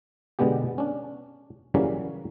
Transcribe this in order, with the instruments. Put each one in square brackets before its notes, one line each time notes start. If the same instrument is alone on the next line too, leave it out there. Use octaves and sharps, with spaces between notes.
[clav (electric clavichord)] B2 D3 G#3 B3 G4
C#4 D4
C#3 E3 F#3 G3 A#3 C#4